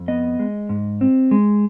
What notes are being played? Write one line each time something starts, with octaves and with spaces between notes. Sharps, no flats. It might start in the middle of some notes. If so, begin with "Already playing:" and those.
Already playing: F2
B3 D#5
G#3
G#2
C4
G#3